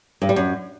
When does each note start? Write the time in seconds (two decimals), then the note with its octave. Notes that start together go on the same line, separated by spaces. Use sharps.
0.22 G2
0.29 G3
0.36 F#2